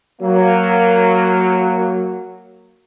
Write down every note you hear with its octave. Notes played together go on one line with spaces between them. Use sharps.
F#3 A#3